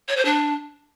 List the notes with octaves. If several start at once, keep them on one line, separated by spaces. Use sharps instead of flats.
C#5
C5
D4